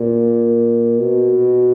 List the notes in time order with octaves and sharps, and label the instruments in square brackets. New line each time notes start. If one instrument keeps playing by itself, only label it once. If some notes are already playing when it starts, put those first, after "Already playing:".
Already playing: [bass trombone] A#2
B2